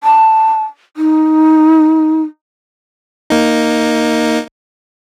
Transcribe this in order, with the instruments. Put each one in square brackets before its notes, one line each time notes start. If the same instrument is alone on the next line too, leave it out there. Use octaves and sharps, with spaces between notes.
[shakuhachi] A5
D#4
[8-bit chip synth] A#3 D#4